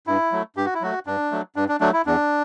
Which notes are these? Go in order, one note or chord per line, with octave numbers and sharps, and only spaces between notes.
G2 E4
F#3 A3
G2 G4
F#4
E4
F#3 A3 F#4
G2 D4
F#3 A3
G2 D4
D4
F#3 A3 D4
E4
E2 D4